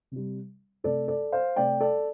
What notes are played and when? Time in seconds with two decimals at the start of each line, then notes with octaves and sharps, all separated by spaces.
0.11 C3 G3
0.84 C3 A3 A4 D5
1.08 A4 D5
1.32 C5 F5
1.56 C3 A3 D5 G5
1.81 A4 D5